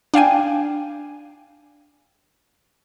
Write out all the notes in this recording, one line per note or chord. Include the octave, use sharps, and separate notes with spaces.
D4 F5 G5 G#5